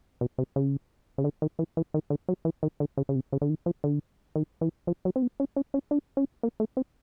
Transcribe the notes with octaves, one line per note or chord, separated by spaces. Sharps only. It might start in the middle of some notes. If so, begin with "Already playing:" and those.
B2
C3
C#3
C#3
D3
D#3
E3
E3
D#3
D3
F#3
E3
D#3
D3
C#3
C#3
C3
C#3
D3
D#3
F3
D3
D#3
E3
F3
F#3
C4
B3
C#4
C#4
C#4
D4
C#4
A#3
A3
C4